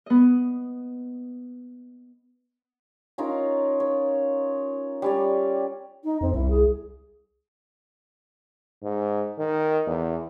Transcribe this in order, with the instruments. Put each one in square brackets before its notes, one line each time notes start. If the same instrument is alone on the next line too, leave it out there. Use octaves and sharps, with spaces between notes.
[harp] B3 D#5
[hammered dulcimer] C#4 D#4 F4 A#4
C#5
G3 C#4 D5
[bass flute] D#4
[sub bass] F2 [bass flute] C4
[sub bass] C2 [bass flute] E4
[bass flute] G#4
[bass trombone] G#2
D#3
E2